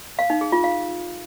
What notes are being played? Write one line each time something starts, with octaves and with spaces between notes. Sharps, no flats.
F5
D#4
G#4
F4
F5